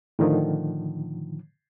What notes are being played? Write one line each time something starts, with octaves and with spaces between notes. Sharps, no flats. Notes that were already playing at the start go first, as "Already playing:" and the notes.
A2 D3 D#3 F3